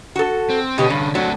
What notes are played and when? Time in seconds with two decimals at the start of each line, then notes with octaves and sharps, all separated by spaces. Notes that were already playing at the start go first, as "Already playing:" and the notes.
0.16 F#4 A4
0.50 C4
0.78 B2 D3 C#4 G4
0.90 G2
1.15 F#3 A3 C4 D4